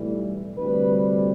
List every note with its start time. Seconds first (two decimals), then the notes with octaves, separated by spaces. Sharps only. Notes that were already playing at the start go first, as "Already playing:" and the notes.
Already playing: B1 A2 E3 G3
0.56 D2 C3 G3 B4